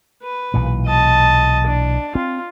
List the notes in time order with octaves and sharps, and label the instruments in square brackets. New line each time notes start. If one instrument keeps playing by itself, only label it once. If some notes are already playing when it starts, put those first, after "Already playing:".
[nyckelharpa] B4
[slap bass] B1 A#2 E3
[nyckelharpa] D#5 A5
D4
[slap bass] C4 [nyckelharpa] F4